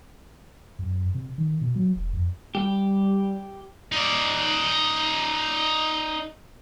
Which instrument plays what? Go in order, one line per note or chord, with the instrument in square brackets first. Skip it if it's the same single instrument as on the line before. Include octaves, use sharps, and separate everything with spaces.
[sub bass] F#2
C3
D#3
B2
F#3
E1
F2
[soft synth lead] G3 [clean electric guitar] G4
[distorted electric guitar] D#4 D5